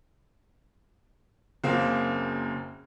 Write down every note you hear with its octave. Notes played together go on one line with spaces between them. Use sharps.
F#1 C#3 A#3 C4